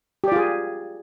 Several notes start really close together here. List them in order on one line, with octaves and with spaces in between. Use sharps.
G4 D5 F4 G#4